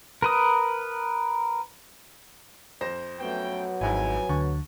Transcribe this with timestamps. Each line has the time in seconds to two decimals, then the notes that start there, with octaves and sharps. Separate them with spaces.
0.22 A#4 B4 D#6
2.81 F2 C5 A#6
3.20 F#3 A3 B3 C#4 G5
3.81 G#1 F2 G#2 E4 G#5
4.29 D2 D3 C#6